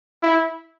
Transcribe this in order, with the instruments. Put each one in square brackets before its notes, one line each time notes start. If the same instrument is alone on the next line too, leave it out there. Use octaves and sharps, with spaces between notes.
[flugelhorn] E4